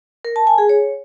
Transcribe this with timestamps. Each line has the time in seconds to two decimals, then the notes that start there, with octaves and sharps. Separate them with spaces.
0.25 A#4
0.36 A5
0.47 G#5
0.58 G#4
0.69 C#5